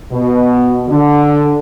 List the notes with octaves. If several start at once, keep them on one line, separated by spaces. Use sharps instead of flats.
B2
D3